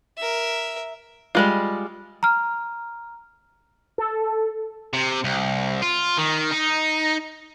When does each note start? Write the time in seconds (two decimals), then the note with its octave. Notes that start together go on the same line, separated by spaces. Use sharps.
0.18 A#4 E5
1.35 G3 G#3 F4
2.23 A#5 F6
3.98 A4
4.93 C3
5.24 C2
5.82 F4
6.18 D#3
6.52 D#4